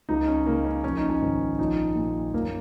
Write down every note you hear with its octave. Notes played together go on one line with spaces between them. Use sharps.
C#2 D#4
C#4
C#3 A#3
C#4
A#1 C#4
D#4
C#4
G#2 D#3
A#1 D#4
A#2
F#1 A#3